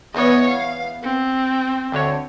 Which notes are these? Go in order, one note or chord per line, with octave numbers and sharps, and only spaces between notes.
E2 E3 B3 C#5 D#5
F5
C4
D2 D3 C#5